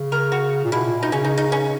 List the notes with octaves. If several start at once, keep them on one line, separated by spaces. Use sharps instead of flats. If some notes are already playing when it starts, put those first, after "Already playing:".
Already playing: C#3
A#4
F#4
A#2
B2 E4
A#2
B2 D#4
C#3 C#4
D#4
D#4
C#4